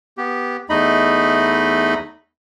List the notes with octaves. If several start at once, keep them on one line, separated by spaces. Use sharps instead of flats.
B3 G4
E2 A3 D#4 D#5 B5